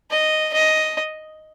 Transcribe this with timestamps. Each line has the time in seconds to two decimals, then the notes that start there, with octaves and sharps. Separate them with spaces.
0.11 D#5
0.54 D#5